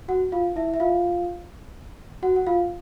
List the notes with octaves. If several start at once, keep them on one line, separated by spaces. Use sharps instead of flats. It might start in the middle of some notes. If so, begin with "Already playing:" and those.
F#4 F#5
F4 F5
E4 E5
E5
F4 F5
F#4 F#5
F#5
F4 F5